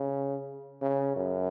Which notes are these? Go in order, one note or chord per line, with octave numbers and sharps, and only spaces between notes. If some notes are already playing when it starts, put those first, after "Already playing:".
Already playing: C#3
C#3
F#2